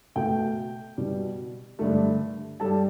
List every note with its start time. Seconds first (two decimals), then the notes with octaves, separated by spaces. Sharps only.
0.16 B2 A3 G5
0.97 B2 G3
1.79 G2 D3 A3
2.60 G2 G3 A4 A5